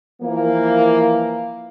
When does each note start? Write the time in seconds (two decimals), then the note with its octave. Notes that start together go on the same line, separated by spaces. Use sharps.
0.21 E3 F3 A#3